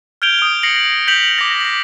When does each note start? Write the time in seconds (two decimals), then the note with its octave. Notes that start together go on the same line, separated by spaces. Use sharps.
0.22 F6 G6 G#6 D7 F7 G7
0.39 D#6 D7
0.63 A#6 C7 C#7 F#7
1.08 G6 B6 F7 F#7
1.38 D6 A#6
1.61 B6 F#7